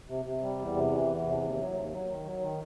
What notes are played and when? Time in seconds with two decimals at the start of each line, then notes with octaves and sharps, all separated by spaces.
0.09 C3
0.25 C3
0.41 G3
0.58 E2
0.75 C3
0.92 E3
1.09 E2
1.25 C3
1.42 D#2
1.58 F#3
1.75 D#2
1.91 F#3
2.09 D#3
2.25 F#3
2.42 D#3